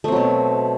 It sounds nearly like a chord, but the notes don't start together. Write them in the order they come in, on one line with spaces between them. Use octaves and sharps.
A3 C4 F#3 B2